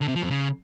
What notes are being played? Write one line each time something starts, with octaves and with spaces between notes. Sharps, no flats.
D3
C3
F3
F2
C#3